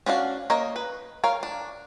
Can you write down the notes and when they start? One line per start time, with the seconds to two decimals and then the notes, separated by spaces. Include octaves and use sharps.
0.06 C#4 D4 F#4 F5
0.50 A#3 A#4 C#5 D#5
0.76 B4
1.24 A#4 C#5 F5
1.43 D4